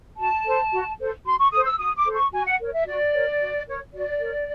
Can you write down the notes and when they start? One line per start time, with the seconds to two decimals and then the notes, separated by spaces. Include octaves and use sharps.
0.17 F#4 A5
0.45 A4 C5
0.71 F#4
0.99 A4 C5
1.25 F#4 C6
1.38 C#6
1.51 A4 C5 D#6
1.65 E6
1.78 F#4 D#6
1.96 D6
2.06 A4 C5
2.14 C#6
2.32 F#4 G#5
2.45 F#5
2.59 A#4 C#5
2.72 E5
2.86 F#4 D5
3.13 A#4 C#5
3.39 F#4
3.66 A#4 C#5
3.93 F#4 D5
4.20 A#4 C#5